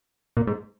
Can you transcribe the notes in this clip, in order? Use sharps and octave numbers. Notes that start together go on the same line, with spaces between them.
A#2
G#2